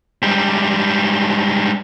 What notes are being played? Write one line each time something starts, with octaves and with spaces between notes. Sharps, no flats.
G#2 G3